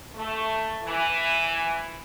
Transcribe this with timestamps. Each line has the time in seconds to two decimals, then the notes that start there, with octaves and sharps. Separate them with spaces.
0.15 A3
0.84 E3